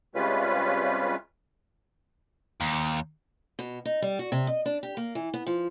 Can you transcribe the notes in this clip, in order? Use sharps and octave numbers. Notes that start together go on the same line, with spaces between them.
C3 G3 G#3 C#4 F4 B4
D#2
B2
D#4
G3
F#4
C3
D#5
D4
G4
A#3
E3
B3
F3